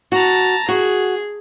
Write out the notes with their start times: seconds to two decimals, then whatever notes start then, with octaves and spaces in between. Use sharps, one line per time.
0.12 F#4 A5 A#5
0.69 F#4 G#4